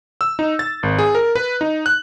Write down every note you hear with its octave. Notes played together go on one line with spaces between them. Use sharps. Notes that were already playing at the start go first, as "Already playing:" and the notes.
E6
D#4
A6
G#1
G#4
A#4
B4
D#4
F#6